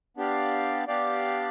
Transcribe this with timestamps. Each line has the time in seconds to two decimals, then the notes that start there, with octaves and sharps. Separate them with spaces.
0.17 B3 D4 G4 D5 F5
0.88 B3 D4 G4 D5 F5